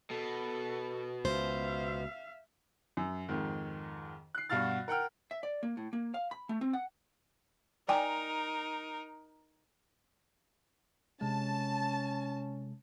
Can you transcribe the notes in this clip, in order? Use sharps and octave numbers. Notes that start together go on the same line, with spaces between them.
B2 A4
C#2 C5 E5 F5
F#2
F2 G#2 D#3
F#6 C7
G2 B2 F#4 F5 F6 A6
A#4 F#5 G5 F6
E5
D5
A#3
A2
A#3
F5
B5
A3
C4
F#5
D#4 A#4 D5 G5 G#5
C3 G#3 C#4 A5